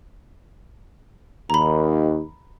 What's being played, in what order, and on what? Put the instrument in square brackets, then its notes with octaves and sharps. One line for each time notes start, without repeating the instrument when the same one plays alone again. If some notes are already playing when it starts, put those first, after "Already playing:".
[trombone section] D#2 [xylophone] A#5 B5